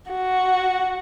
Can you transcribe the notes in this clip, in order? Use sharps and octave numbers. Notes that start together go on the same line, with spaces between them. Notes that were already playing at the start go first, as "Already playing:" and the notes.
F#4